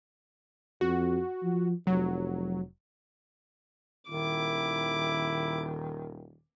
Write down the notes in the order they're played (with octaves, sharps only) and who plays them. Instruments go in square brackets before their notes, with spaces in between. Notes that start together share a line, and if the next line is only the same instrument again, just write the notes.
[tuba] F2 [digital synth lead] F#4
[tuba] F3
[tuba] F1 [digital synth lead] F#3
[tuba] D#1 [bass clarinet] D#3 [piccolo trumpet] E4 [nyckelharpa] D6